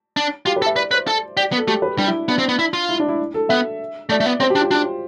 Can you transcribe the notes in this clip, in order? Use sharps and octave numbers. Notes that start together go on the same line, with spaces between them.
D4
F4 G4
B4
A4
E5
B4 D5
B4 C5
A4
G4 D5
B3
A4
A3 G4
B4
G3 D4
E4
B3 D4
C4
B3
E4
F4
E4
D4
E4
A4
B3 E5
A3 D5
A3
B3
C4 C5
G4
D4
F4
D4 G4